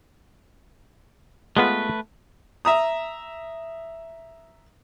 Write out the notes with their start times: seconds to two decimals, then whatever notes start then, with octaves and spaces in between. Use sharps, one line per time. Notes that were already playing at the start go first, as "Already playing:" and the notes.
1.57 G#3 A3 B3 F4 B4
2.65 E5 A#5 D#6